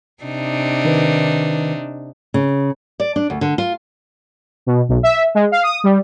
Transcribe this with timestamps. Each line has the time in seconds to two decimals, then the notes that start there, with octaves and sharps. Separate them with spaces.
0.23 C3 D4 D#4
0.85 D#3 B4
2.34 C#3
3.00 D5
3.16 D4
3.30 D2
3.41 D3
3.58 F4
4.66 B2
4.89 B1
5.03 E5
5.35 G#3
5.52 F5
5.63 D#6
5.84 G3